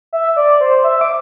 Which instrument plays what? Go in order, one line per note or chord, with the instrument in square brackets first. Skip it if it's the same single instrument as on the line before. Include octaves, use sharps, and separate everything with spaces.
[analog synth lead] E5
D5
C5
E5
D6